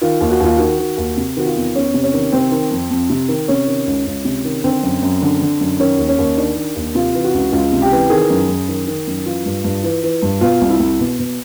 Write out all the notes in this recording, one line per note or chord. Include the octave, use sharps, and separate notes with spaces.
D#3 F4
D#2
F#4
D#2 F4
D#3 F#4
D#3
D#2
C3
D#3 F#4
F4
E2
E2 C#4
C3
C#4
D#3
C3 C4
D#3
F2
F2
C3
D#3
C3 C#4
D#3
C#2
C#2
C3
D#3
D3 C4
F#2
F#2
D3
D3
F#2
D#3 C#4
D#2
C#4
D#2
D#3 D4
D#3
D#2
C3 F4
E3
F#4
C#2
C#2 F4
C3
G4
E3
D#3 G#4
F#2
F#2
D#3
D#3
F#2
E3 F4
G2
G2
E3
E3
G2
B2 F4
C2
E4
C2
B2
B2